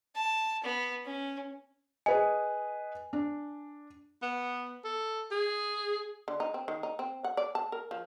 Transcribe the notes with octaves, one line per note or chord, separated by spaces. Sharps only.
A5
B3
C#4
G#4 B4 D#5 G#5
D4
B3
A4
G#4
D3
D#4
C4
D#3
D#4
C4
F#5
D5
A5
A#4
F3